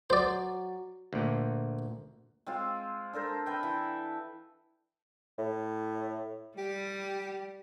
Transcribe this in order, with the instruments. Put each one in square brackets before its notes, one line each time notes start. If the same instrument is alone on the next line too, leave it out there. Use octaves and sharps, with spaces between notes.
[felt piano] F#3 [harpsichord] C5 D5
[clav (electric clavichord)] D2 A#2 [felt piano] A3
[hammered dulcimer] G#3 C4 F4
D4 A4 A#4 C5
B4 E5 G5
E3
[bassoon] A2
[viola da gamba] G3 [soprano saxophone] G4